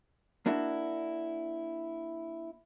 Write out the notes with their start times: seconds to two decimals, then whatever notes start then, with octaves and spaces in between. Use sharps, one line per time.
0.46 A#3 D4 E4 F#4